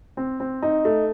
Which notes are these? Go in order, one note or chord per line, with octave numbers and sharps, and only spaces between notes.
C4
C4
D#4
A3